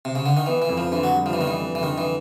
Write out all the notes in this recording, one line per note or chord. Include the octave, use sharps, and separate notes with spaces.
C3
C#3
D3
D#3
E3 B3
E3
F2
F3
D3 E3
F#3
G3
F3
E3
D#3 B3
E3
F2
E3
D3 D#3
E3